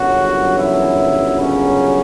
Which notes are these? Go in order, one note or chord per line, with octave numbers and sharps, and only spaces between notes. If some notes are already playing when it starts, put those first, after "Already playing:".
Already playing: G1 F#2 C#3 F#3 F#4
E3 E4
C#3 C#4